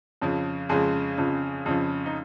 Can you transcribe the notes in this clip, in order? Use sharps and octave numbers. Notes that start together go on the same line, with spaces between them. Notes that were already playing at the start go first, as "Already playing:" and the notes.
F2 C#3 F3
F2 C#3 F3 G#3 G#4
F2 C#3 F3
F2 C#3 F3
D#4